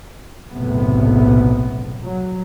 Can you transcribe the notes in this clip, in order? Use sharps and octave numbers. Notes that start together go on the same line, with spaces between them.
F#1 B1 A2 C3 B3
F#3